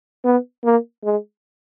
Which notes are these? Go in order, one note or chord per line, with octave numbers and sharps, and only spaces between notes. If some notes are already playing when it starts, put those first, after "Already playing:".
B3
A#3
G#3